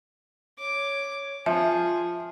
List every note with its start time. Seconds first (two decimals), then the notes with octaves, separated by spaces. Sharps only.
0.59 C#5 D6
1.46 F3 F4 G#4 E5